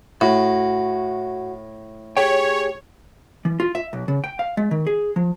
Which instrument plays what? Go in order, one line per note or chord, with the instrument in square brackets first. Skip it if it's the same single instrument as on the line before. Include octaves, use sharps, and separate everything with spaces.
[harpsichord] A2 [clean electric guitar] F#4
[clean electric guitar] G4 G#4 G5 [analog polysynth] C#5
[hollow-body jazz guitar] E3
F4
E5
B1
C#3
G5
F5
G#3
D#3
G#4
F3